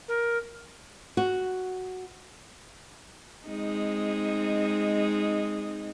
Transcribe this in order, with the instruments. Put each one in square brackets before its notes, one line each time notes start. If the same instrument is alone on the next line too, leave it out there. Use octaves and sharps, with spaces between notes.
[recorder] A#4
[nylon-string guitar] F#4
[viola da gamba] G#3 C4 D#4